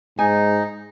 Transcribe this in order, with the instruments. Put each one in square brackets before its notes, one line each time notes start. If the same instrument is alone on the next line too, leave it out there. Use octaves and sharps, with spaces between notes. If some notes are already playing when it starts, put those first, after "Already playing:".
[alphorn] G#2 [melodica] D#4 [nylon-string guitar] G#5